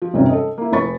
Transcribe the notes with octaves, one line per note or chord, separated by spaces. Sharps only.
F3
E1 G2 C3 G3 C#4 D#4
A4 D#5
A#3 E4
F1 B5 C#6 A6